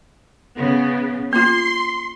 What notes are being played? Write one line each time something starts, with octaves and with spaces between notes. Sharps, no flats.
C#3 B3
A#3 F4 C6